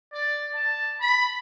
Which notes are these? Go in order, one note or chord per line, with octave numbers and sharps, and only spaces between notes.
D5
A5
B5